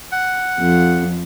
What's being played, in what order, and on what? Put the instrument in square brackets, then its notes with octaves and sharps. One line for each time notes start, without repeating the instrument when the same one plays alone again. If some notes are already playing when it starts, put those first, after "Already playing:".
[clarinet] F#5
[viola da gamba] F2